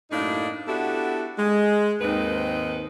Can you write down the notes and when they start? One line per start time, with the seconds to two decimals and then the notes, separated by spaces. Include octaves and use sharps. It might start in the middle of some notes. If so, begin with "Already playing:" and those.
0.11 F#2 A2 A#3 D4 D#4
0.67 B3 D4 E4 F#4 G4 A4
1.38 G#3
2.01 D#2 G#2 D#3 C4 D#4 B4